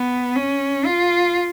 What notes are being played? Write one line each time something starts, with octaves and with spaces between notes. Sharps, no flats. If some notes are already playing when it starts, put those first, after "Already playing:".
Already playing: B3
C#4
F4